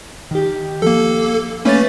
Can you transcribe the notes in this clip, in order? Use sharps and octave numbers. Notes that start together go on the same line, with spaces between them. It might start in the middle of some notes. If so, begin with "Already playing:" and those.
D#3 G4
F3 A#3 A4
A3 A#3 C#4 B4 C#5 A6